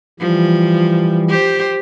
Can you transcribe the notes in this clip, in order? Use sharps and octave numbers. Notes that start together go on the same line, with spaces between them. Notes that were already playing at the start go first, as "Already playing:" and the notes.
E3 F3 G3
G4 C5